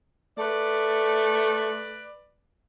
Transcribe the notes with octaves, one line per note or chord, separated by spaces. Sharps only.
A3 B4 D5